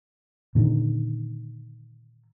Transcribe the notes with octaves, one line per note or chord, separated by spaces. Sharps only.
A#2 D3 D#3